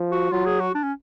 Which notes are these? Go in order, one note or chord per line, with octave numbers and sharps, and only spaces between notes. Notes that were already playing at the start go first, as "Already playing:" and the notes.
Already playing: F3
F#4
F#3 F4
G#4
F#4
D4
C#4